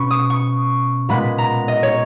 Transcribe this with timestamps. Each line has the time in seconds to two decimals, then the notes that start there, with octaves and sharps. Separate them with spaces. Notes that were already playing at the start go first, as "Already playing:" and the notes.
Already playing: B2 C#4 B5 C#6
0.11 D#6
0.30 C#6
1.09 A#2 G#3 B3 B5
1.38 A#5
1.68 D#5
1.83 C#5